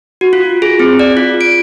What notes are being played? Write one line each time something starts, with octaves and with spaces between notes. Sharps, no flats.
F#4
F4
G#4
C4
D5
F4
D7